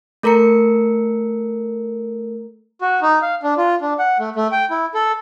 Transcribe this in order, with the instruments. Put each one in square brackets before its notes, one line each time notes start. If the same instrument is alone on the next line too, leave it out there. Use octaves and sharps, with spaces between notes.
[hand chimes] A3 A4 A#4 A#5 C#7
[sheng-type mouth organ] F#4
D#4
F5
D4
F4
D4
F#5
A3
A3
G5
E4
A4